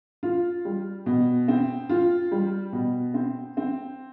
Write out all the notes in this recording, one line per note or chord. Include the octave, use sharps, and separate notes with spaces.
F4
G3
B2
C4
F4
G3
B2
C4
C4